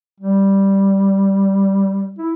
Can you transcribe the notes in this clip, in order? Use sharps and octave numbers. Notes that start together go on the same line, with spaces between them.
G3
E4